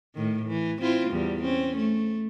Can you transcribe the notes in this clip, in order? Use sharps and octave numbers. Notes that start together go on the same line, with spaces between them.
A2 D#3
E3
C4 E4 F4
E2 G3
C4 C#4
A3